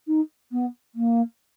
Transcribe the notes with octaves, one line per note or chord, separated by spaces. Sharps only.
D#4
B3
A#3